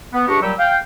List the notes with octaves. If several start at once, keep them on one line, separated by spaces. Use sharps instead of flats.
B3
C#2 D4 G4 D#5 C#6
A#2 F#3 G3 G4 E6
F5 G5